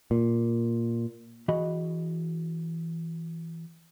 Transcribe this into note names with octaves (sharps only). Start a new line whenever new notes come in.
A#2
E3 F#4 G#4 D#5 B5